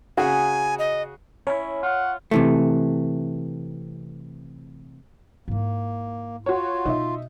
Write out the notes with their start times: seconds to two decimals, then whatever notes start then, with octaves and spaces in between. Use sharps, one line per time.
0.17 C#3 F#4 G#4 G#5
0.79 D#5
1.47 C#4 E4 C#5
1.83 F4 F#5
2.31 C3 E3 A3
5.48 G#2 A#3 E4
6.46 F4 F#4 C#5
6.86 B2 D#4 E5